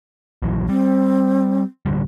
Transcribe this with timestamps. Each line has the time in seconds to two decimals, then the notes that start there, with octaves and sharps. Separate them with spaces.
0.42 A#1 E3 F#3
0.69 G3 C4
1.86 D1 D3 G3